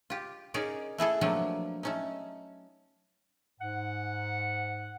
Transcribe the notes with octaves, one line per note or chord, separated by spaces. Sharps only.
F4 G4
C#4 D#4 G#4 A#4 C#5 D5
A3 E4 G#4 A4
F3 F#3 A3 A#3 C4 D4
A3 C#4 D#4
G#2 F#5